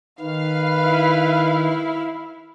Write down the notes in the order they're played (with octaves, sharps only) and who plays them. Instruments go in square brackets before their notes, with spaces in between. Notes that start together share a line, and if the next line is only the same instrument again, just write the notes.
[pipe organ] D#3 [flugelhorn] B4 [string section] F5
[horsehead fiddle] E4